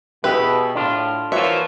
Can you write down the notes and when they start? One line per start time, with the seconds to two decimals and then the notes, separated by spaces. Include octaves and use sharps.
0.24 B2 E4 G4 G#4 B4
0.75 A2 D4 F4
1.32 E3 F3 A#3 F#4 C#5 D5 E5